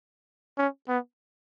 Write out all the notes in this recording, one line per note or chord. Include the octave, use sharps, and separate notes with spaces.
C#4
B3